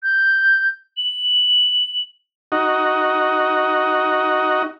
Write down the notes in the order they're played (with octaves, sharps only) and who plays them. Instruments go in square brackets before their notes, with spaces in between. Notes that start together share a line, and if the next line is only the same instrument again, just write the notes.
[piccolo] G6
F#7
[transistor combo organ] D#4 F#4